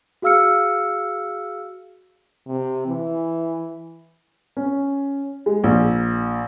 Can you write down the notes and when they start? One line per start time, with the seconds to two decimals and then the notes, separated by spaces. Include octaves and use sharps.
0.22 F#4 G#4 F5 E6 F6 C#7
2.47 C3
2.87 E3
4.57 C#4
5.46 G#3
5.64 A#1